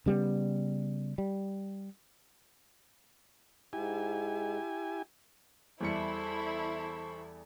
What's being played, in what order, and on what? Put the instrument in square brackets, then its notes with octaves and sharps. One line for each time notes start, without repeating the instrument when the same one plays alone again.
[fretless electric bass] C#3 G3 A3 B3
G3
[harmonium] G#2 [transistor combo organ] E4 G4 G#5
[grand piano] E2 G3 C#7 [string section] E4 [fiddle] A4 [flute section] C5 A5 C#6